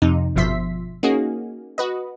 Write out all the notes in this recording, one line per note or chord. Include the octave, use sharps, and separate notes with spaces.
F2 C3 D#4
G1 B2 F3 E5 C6 B6
A#3 C#4 D#4 F#4 G#4
F#4 B4 D#5